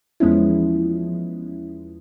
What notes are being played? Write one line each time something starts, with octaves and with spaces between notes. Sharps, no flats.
E2 F3 G#3 B3 C#4 E4